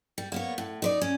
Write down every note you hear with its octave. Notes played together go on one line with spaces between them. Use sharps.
G3
A#3 B3 C#5
A2
D#4 B4 D5
C#4